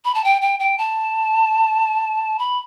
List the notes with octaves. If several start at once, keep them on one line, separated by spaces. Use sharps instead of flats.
B5
A5
G5
G5
G5
A5
B5